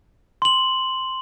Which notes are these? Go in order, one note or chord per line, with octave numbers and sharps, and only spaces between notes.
C6 F#7